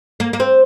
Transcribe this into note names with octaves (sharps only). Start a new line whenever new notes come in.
A#3
A#3
C4